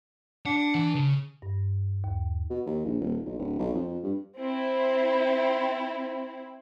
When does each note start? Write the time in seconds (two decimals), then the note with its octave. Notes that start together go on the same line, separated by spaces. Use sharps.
0.46 D4 F#5
0.75 E3
0.95 C#3
1.42 G2
2.04 D#2
2.50 B2
2.66 D#2
2.85 A#1
3.01 D#1
3.26 B1
3.39 D1
3.59 B1
3.74 F2
3.88 F2
4.03 G2
4.39 C4 E4